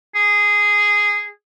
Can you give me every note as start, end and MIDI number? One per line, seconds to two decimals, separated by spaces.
0.15 1.29 68